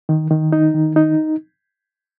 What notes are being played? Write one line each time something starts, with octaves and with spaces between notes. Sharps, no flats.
D#3
D#3
D#4
D#3
D#4